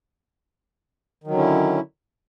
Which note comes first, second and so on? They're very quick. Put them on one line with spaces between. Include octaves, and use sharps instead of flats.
D#3 F#3 D3 C#4 E4